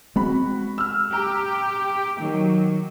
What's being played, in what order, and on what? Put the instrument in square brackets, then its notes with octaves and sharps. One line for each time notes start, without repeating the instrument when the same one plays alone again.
[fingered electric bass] G#3 C4 [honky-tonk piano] F#4 B5
[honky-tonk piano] E6 F6
[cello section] G4 [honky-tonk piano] A#5
[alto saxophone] D#3 [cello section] F#3